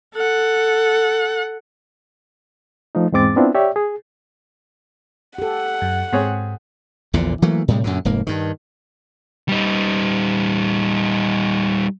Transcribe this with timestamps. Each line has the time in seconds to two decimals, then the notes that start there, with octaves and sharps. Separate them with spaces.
0.15 A4 F#5
2.95 F3 A3 D#4
3.12 E2 G#2 G#3 C4 D6 A6
3.36 B3 C4 D4 E4 F4
3.55 G4 C#5 D5 E5 G5
3.76 G#4
5.38 G4 A4 F#5
5.82 F#2
6.13 G#2 C4 G#4 C#5
7.13 A#1 E2 A#2 D3
7.42 E3 F#3 A3 A#3
7.68 A2 C3 G3 G#3
7.84 F#2 A#2 D3
8.05 F1 G#2 A#3
8.27 G2 D#3
9.49 G3 D#4